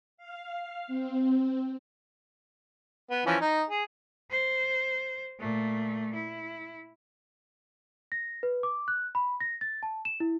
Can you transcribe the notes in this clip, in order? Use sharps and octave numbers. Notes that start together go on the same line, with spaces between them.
F5
C4
B3
E3 F3 C#4
D#4
G#4
C5
A#2 A3
E4
A#6
B4
D6
F#6
B5
A#6
A6
A5
E7
E4